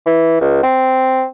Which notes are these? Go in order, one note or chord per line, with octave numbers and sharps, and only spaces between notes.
E3
C#2
C4